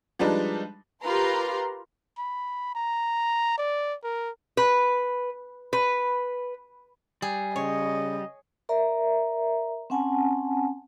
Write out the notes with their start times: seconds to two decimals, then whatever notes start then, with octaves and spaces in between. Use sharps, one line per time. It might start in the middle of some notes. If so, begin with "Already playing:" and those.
0.19 F3 G3 G#3 D4 D#4 B4
1.03 F4 G4 A#4 B4 A#5 C6
2.18 B5
2.75 A#5
3.58 D5
4.04 A#4
4.57 B4
5.73 B4
7.22 G3 G#4
7.56 C#3 C#5 D#5
8.69 A#4 D5 E5 A#5
9.90 C4 C#4 F#5 G#5 A5